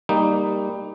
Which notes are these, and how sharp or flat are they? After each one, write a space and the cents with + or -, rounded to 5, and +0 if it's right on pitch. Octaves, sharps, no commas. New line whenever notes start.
G3 +10 A#3 +0 D#4 +0